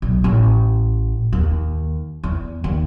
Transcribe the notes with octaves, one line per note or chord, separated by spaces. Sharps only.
B1
A1
D#2
E2
D#2